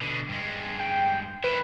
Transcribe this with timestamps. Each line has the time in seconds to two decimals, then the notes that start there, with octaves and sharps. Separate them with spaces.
0.01 B2 D3
0.29 G2 G#3
0.80 G5
1.44 D#3 E4 B4